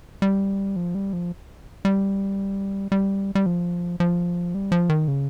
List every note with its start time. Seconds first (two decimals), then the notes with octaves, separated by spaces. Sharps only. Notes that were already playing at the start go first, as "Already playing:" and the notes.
0.22 G3
0.76 F3
0.95 G3
1.13 F3
1.85 G3
2.92 G3
3.35 G3
3.46 F3
4.00 F3
4.55 G3
4.72 F3
4.89 D#3
5.08 C#3